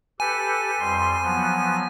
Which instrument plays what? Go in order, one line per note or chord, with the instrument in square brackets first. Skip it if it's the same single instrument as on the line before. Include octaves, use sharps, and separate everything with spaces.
[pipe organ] G4 A4 B4 [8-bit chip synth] G#5
[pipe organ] F2 G3 C6
F3 F#3 B3